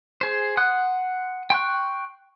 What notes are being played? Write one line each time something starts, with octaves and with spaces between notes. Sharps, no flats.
G#4 C5
F#5 C6 D#6 F#6
G5 C6 C#6 F#6